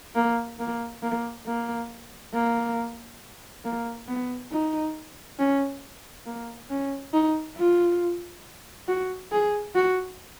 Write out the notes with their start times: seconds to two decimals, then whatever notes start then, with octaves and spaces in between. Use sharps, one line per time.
0.15 A#3
0.59 A#3
1.03 A#3
1.46 A#3
2.34 A#3
3.65 A#3
4.08 B3
4.52 D#4
5.39 C#4
6.26 A#3
6.70 C#4
7.14 D#4
7.57 F4
8.88 F#4
9.32 G#4
9.75 F#4